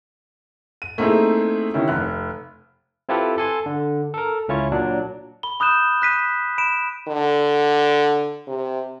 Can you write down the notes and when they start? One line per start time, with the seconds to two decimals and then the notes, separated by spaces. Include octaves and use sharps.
0.82 D#7
0.98 A3 A#3 C4 D#4 E4 G#4
1.74 C3 D#3 C#4 E4
1.88 F1 F#6
3.09 C4 E4 F4 G4 A4 B4
3.38 A4 G#5 C6
3.66 D3
4.14 A4 A#4
4.48 C#2 C#4 E4 F4 C#6
4.72 A#2 F#3 D4
5.43 B5 G7
5.60 B5 D#6 F#6 G6 E7
6.02 F#6 B6 D#7
6.58 B5 D7 E7
7.08 D3
8.48 C3